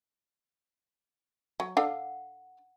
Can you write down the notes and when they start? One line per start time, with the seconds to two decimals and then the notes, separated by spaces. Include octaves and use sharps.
1.60 F#3
1.77 D4 A4 F5 F#5